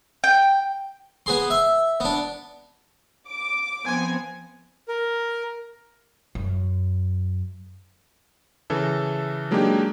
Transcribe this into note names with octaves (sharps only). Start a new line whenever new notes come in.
G5
B3 G#4 C6
E5
B3 D4
D6
F3 B3 C4 G#5
A#4
F#2
C#3 E3 A4
F#3 G#3 A#3 D4 D#4 G4